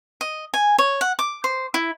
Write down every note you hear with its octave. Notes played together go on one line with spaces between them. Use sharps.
D#5
G#5
C#5
F#5
D6
C5
E4